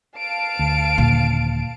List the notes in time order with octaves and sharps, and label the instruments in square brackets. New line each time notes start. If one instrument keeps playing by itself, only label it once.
[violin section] F5 A5 D7
[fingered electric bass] D2
[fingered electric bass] D#1 D#2 D3 [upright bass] A#2